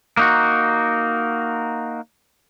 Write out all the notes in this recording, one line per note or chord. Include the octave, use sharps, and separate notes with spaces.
A#3 D#4 F#4